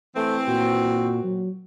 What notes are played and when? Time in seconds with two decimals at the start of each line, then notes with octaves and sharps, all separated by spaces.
0.16 E3 A3 C4
0.48 A#2 F#4
1.24 F#3